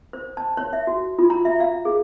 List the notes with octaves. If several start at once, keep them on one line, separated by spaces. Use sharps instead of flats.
C5
A5
C#5
E5
F#4
F4
A#5
E5
F5
G#4